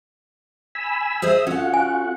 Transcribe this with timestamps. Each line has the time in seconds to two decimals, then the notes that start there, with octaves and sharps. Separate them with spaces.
0.75 G#5 B5 E6
1.22 G#4 C5 D#5 E5 E6
1.47 C#4 F4 F#4 A4 F#5
1.74 G#5